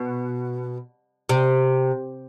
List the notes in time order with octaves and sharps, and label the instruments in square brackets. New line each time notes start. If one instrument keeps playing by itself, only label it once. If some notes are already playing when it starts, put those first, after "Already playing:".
Already playing: [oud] B2
C3